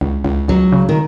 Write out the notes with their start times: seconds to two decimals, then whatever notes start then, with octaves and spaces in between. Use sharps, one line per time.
0.01 C#2
0.24 C#2
0.48 C#2 F#3
0.72 C#3
0.89 D#3